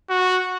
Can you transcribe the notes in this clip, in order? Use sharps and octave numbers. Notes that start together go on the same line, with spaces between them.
F#4